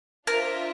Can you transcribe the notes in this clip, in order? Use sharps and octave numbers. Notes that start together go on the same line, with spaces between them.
D4 F4 A#4 C5 E5